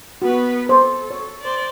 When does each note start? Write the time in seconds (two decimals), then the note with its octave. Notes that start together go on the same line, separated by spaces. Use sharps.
0.22 B3 F#4 B4
0.69 A4 C5
1.11 C#5
1.41 C5 D5